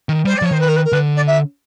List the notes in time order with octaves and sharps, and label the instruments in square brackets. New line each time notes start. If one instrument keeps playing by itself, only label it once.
[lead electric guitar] D#3
[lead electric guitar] G3 [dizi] C5
[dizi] D5
[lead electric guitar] F3 [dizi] C#5
[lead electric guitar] D#3 [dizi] C5
[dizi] B4
A#4
B4
A#4
[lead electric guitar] D3 [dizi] B4
[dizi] D5
E5